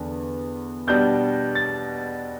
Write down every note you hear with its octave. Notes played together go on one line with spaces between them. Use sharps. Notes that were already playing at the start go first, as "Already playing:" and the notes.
Already playing: E2 D3 B3 D4
B2 G3 D4 G6
A6